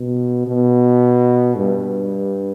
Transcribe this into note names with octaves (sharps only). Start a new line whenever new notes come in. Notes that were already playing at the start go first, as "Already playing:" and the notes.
Already playing: B2
B2
G2